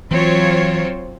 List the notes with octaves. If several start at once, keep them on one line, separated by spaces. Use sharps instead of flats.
E3 F#3 C4 F4 C5 C#5